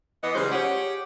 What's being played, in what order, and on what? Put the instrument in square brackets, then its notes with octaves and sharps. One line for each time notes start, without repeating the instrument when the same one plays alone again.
[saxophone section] E3 B3 D#5
[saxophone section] C#3 G3 G#3 [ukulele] C5
[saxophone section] G4 F#5 [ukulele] G#4 C#5